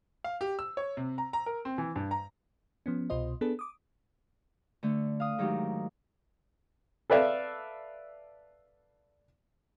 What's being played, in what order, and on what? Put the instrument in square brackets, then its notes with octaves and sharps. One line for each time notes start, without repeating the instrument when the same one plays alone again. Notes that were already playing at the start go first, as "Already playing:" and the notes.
[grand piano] F5
G4
E6
C#5
C3
A#5
A#5
A#4
C4
E3
G2
A#5
[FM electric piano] F3 B3 C#4
C2 B2 F4 C5 D#5
B3 D4 G#4 A4 B4
D6 D#6
[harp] D3 A3
F5 D#6
G#2 D#3 F#3 D#4 G4
[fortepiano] A4 B4 D5 E5 F5